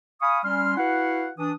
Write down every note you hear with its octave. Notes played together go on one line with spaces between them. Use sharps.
F5 G#5 B5 C#6 D#6
G3 C#4 C6 F6
E4 F#4 B4 F5 F#5
E3 D4 D#6